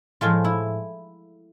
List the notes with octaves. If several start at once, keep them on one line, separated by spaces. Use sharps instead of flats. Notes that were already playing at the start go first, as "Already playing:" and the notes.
A2 F3 G#3 F4
E4